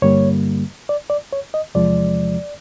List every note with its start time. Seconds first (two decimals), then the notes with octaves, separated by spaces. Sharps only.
0.02 G2 D3 G3 A#3 C#5
0.89 D5
1.10 D5
1.33 C#5
1.54 D#5
1.75 E2 C3 F3 G#3 D5